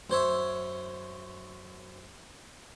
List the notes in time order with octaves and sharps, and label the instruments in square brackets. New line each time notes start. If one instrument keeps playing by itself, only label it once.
[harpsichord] F#2 C5 C#5 E5